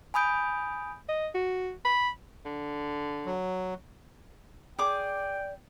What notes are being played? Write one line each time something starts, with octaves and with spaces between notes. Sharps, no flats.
G#5 B5 D#6 G6 D7
D#5
F#4
B5
D3
F#3
G#4 D5 G5 D6